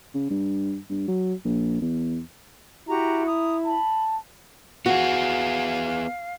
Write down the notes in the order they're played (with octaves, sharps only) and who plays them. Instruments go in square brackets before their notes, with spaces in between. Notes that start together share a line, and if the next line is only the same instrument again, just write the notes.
[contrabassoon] C#3
G2
G2
F#3
A#1
E2
[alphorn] E4 [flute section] F#4 G4 A#5
[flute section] A#5 D#6
[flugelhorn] A5 [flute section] B5
[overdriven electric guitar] B3 G#4 [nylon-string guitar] F#4 [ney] F5